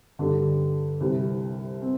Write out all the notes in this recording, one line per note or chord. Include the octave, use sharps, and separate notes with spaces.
G2 D3 G3 D4 A4
C2 C3 G3
C4